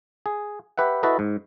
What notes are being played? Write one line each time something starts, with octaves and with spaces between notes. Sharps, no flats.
G#4
G4 B4 E5 F#5
E4 F#4 A4 B4 D#5
G#2